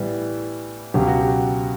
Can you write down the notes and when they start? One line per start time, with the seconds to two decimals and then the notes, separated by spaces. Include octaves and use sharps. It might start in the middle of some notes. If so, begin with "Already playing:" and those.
Already playing: A2 E3 G3 B3
0.94 C#2 B2 F#3 G4
1.08 F#4
1.21 G4